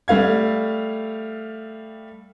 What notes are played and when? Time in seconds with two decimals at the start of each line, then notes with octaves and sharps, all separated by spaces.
0.08 G3 A3 F5 G#6